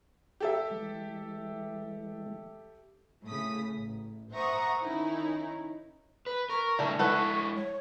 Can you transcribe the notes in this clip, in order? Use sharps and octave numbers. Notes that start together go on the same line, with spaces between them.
G4 A4 E5
E3 G#3
A2 C#3 D#6 B6
A1
C5 E5 F#5 A#5 C#6 D#6
D#3 C#4 D#4 E4
B4
A#4 C#6
C#3 E3 G3 A3 D4
G#3 E4 A4 B4 F#5 C#6
C#5